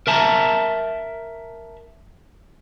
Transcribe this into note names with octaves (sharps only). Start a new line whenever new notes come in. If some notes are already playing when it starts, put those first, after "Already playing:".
A#4 E5 A5 A#5